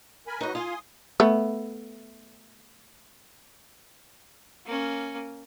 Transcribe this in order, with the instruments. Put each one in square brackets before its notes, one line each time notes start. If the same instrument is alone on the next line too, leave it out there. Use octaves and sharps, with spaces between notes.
[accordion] A#4 G#5 B5
[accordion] F#3 F#4 B4 [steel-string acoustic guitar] D#4 D#5
[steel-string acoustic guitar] F4 F5 [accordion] G#5 C6 D#6
[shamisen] A3 B3
[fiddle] A#3 C#4